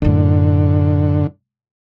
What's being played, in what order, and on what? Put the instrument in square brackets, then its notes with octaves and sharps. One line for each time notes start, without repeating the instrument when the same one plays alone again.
[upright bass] F#2 A2 [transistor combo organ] D3